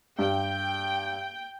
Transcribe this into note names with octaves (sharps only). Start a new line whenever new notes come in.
G2 G5